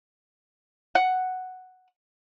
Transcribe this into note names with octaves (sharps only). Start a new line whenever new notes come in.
F#5